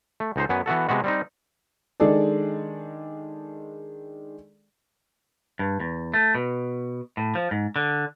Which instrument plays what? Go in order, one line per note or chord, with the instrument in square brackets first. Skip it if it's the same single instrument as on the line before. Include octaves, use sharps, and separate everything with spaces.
[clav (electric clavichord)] A3
C#2 D#4 C5
F#2 B3 G#5
E3 B3 F#4 A4
C3 G#3 B3 F#4
G3 C4 D#4
[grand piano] D#3 G#3 D4 G#4 A4 D5
[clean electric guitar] G2
E2
A3
B2
A2
F3
G#2
D3